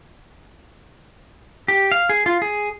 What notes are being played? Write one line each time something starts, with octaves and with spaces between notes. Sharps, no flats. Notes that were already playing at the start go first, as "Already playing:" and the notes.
G4
F5
G#4
F4
G#4